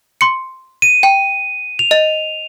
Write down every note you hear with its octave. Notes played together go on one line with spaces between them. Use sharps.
C6 C#7
D#7
G5
F7
D#5